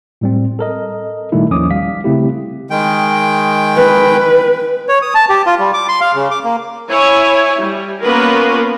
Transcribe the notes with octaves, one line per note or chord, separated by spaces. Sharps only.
A2 G3 C4
A4 A#4 D#5
A#2 D#3 G3 A3 D#4 E4
G#1 D#2 F3 C#4 D6 D#6
G3 F5 B6
C#3 A3 C4 E4 G4
D#3 G#3 G5
B4
C#5
D#6
A5
G4
F4
G3
D6
C6
F5
C#3
D6
A#3
E4 C#5 E5 G#5
G3
A#3 B3 C#4 F4 A#4 B4